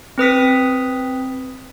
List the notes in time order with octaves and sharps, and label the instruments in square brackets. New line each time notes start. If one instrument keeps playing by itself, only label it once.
[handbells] C4 B4 D#6 B6